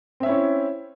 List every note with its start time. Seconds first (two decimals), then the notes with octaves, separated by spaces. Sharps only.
0.20 C4
0.23 E5
0.26 C#4
0.29 E4
0.32 C#5